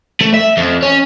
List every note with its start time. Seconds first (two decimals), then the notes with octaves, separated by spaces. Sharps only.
0.21 A3
0.34 E5
0.57 F2
0.82 C#4